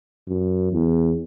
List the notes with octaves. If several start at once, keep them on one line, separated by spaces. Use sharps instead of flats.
F#2
E2